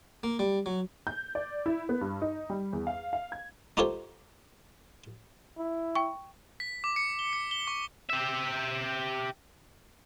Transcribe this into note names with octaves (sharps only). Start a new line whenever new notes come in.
A#3
G3
F#3
G6
D5
E4
B3
G2
D#4
G3
E2
F5
F5
G#6
D#4 F4 G4 A4 C5 C#5
E4
G5 C#6
B6
D6
C#7
G7
C#7
G7
C#6
G4 E5